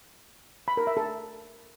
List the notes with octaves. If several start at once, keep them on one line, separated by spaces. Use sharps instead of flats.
B5
A#4
E5
A4